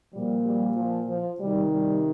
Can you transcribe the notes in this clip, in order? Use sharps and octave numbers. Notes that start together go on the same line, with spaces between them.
A#2 F3 G3
G3
F3
F3
C3 D#3 G3
G3